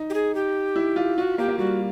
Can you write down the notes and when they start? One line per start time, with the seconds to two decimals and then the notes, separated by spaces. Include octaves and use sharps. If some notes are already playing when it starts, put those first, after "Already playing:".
Already playing: D#4
0.10 G4
0.14 G#4
0.35 G4
0.76 E4
0.96 F4
1.17 F4 F#4
1.38 A#3 G4
1.48 A#3
1.58 G3 F#4